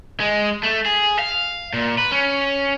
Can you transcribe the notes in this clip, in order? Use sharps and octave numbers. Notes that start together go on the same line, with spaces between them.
G#3
A3
G#4
F5
A#2
B4
C#4